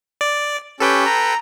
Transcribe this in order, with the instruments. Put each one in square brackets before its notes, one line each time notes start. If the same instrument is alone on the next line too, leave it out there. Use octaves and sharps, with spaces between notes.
[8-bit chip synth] D5
[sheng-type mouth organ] C#4 G4 [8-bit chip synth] A4 B4 G5
[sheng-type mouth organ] A#5